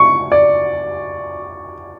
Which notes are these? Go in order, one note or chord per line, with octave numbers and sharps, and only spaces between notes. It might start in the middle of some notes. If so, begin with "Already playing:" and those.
Already playing: C#6
D5